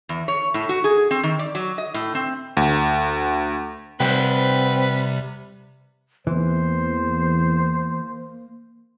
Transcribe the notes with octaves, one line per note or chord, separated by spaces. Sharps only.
E2
C#5
A2
F#4
G#4
C4
D#3
D5
F#3
D#5
A2
C4
D2
C3 G3 C4 B4 C5 F#5 G5
E2 E3 A#3 C5